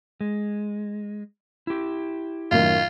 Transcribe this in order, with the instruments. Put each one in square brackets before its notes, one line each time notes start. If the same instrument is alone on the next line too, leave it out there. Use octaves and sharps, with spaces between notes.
[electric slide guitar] G#3
E4 G4
[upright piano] F#2 A2 D#3 [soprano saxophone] F4